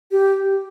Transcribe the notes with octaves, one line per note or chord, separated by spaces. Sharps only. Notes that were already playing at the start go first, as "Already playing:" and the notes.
G4